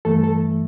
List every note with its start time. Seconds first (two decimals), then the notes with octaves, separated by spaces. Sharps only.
0.05 G2 E3 A3 A4
0.24 A4